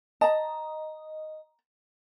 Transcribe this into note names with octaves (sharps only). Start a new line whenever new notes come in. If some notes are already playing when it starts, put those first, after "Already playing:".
D#5 A5 A#5